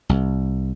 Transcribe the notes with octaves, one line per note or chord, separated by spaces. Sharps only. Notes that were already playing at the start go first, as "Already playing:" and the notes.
C2